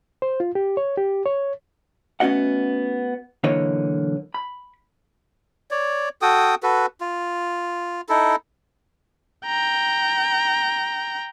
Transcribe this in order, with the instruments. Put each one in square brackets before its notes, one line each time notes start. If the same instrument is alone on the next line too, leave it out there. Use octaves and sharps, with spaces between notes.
[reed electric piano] C5
F4
G4
C#5
G4
C#5
[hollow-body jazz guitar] A3 B3 C#4 F#4 D#5 F#5
B1 D3 E3 A#3 C#5 D#5
B5
[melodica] C#5 D5
F#4 A4 G5 D#6
F#4 A4 B4
F4
D#4 E4 A4
[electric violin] G5 A#5